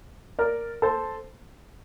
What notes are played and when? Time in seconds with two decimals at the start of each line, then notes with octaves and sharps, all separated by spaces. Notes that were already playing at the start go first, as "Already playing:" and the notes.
0.39 A#4 D5
0.82 A4 C5